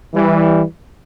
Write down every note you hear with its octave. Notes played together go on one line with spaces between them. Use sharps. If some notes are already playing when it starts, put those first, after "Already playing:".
E3 G3